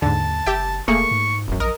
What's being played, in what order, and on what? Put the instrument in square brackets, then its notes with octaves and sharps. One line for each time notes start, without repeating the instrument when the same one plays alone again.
[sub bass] D#2 [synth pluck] G#2 D3 [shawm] A5
[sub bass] F#1 [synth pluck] G4 E5 G5
[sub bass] E1 [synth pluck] A3 A#3 G#4 [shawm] C#6
[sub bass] G#2
[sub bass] D#1 [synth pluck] A1 F#2
[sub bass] A#1 [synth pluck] A#4 [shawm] D#5